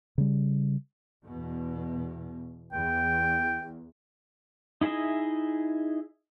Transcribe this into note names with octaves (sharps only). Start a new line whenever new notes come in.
C#3 G3
E2 B2
E2 G5
D#4 E4 G#4 D#5 E5